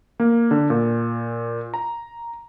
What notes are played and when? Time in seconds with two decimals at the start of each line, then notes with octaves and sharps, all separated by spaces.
0.20 A#3
0.51 D3
0.70 A#2
1.74 A#5